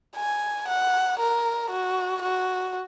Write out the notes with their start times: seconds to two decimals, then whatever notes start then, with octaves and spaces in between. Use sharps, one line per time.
0.17 G#5
0.68 F#5
1.19 A#4
1.71 F#4
2.22 F#4